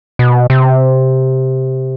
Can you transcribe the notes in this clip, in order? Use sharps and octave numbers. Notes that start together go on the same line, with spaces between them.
B2
C3